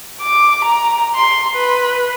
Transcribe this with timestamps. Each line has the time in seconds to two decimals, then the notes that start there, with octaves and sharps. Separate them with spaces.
0.21 D6
0.65 A#5
1.15 C6
1.56 B4